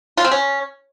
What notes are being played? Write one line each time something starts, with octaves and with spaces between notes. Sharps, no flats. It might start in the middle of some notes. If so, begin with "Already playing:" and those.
F4
C4
C#4